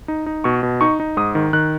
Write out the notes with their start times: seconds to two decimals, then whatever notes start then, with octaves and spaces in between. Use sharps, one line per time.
0.08 D#4
0.26 D#4
0.44 B2 C#6
0.63 B2
0.81 D#4 C#6
1.00 D#4
1.17 G#2 D#6
1.35 D#3
1.53 D#3 F#6